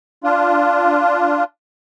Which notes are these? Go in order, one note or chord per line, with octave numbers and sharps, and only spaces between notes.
D4 F4